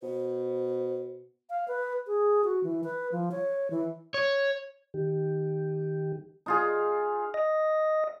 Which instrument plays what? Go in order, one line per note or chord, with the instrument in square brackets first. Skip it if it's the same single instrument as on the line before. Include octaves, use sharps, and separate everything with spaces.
[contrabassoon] B2 [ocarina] C5
[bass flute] F5
B4
G#4
F#4
E3
B4
F3
C#5
E3
[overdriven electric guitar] C#5
[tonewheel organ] D#3 G4
[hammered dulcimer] D#4 F4 G#4
[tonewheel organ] D#5